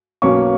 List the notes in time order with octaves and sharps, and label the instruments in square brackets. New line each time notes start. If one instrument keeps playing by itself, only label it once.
[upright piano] B1 B2 A#3 C#4 C#6